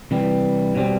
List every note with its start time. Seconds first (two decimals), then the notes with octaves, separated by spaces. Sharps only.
0.11 C3 E3 G3
0.75 B2 G3 C4